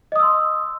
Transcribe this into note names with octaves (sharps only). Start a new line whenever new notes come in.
D#5 C6 D#6 E6